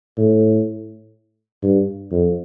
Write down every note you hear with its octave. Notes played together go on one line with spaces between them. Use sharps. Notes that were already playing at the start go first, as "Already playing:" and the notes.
A2
G2
F2